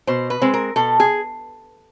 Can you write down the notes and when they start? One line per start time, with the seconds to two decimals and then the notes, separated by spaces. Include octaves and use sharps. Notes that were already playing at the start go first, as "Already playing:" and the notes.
0.07 B2 C5
0.30 B4
0.42 G#3 C4
0.54 A#4
0.76 B2 A4
1.00 G#4